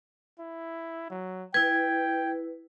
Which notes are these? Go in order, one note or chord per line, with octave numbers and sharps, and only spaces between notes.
E4
F#3
E4 B4 G5 G#6